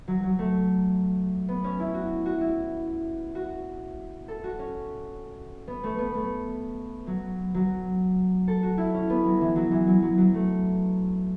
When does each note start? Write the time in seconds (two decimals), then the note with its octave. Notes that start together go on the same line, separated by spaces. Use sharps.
0.08 F#3
0.23 F#3
0.39 A3
1.49 B3
1.64 C#4
1.80 E4
1.94 F#4
2.26 F#4
2.41 E4
3.35 F#4
4.28 A4
4.44 F#4
4.59 C#4
5.67 B3
5.84 A3
5.99 B3
6.14 A3
7.07 F#3
7.54 F#3
8.48 A4
8.63 F#4
8.78 E4
8.94 C#4
9.10 B3
9.25 F#3
9.41 E3
9.56 F#3
9.72 E3
9.87 F#3
10.02 F#3
10.18 F#3
10.34 A3